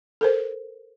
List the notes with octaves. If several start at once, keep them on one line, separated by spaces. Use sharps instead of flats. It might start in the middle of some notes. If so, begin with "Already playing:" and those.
A4 A#4 C5